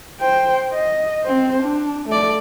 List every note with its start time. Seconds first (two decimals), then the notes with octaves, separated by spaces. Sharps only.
0.20 C5 G5
0.73 D#5
1.24 C4 C5
1.63 D4
2.09 A3 D5